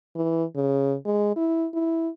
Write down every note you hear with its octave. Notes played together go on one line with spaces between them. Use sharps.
E3
C#3
G#3
E4
E4